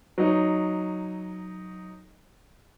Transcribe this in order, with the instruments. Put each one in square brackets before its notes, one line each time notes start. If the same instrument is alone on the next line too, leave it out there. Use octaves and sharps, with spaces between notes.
[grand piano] F#3 D#4